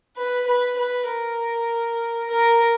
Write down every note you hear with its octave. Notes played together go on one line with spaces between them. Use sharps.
B4
B4
B4
A#4
A#4